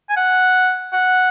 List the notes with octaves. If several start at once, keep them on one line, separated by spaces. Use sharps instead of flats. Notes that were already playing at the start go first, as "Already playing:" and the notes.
G#5
F#5
F#5